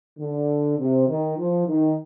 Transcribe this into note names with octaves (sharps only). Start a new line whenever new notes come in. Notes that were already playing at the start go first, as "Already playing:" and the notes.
D3
C3
D#3
F3
D#3